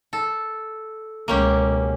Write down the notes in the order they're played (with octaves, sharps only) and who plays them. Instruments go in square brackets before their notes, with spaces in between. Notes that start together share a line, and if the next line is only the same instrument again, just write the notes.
[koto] A4
[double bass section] C#2 B2 [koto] A#3 C#4 G4